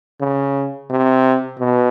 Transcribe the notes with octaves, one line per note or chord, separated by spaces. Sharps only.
C#3
C3
B2